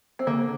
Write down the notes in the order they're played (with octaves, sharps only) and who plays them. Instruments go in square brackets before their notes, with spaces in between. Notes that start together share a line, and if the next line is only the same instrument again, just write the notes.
[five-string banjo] C4
[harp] D3 [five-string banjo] A#3